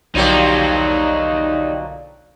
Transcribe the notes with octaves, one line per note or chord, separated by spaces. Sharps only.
B1 D3 F3 F#3 A#3 D#4 G4 D5